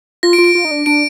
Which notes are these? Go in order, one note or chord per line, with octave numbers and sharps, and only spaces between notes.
F4 A#6
D7
F4
D7
F4
D#4
D4
D4 D7